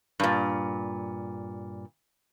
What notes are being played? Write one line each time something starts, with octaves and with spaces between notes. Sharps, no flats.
G2 A#2